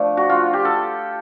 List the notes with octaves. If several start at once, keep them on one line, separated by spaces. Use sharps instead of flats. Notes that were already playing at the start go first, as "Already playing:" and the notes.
Already playing: F3 A3 D4 F4
F#4
F4
G4
A4